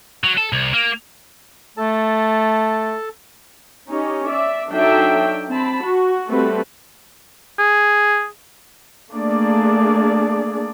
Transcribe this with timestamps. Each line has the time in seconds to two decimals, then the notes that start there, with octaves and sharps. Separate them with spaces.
0.24 F#3
0.37 A4
0.53 C2
0.74 A#3
1.77 A3 A4 A5
3.89 C#4 D#4 G4
4.26 D5 E5
4.70 F#3 D4 D#4 A4 E5 G5
5.49 C4 A5 B5
5.83 F#4
6.30 G3 A3 C4 F#4 A4 B4
7.59 G#4
9.12 A3 A#3 D4 G#4 D5